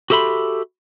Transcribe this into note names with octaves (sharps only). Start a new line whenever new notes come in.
F#4 G4 A4 E5 B5 C6